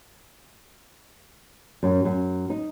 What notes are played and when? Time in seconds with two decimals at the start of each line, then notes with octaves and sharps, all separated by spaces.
1.83 F#2
2.05 F#2
2.50 D#4